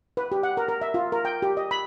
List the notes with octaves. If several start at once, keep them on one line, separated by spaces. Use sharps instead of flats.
B4
G4
F#5
A#4
A#4
E5
F4
A#4
G5
G4
D#5
B5